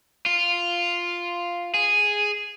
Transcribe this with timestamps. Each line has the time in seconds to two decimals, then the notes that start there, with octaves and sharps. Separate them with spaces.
0.26 F4
1.74 G#4